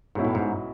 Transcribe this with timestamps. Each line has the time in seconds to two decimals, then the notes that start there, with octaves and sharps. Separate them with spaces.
0.15 B1 G#2 B2 F#3 C#4 E4
0.25 A2
0.35 G#2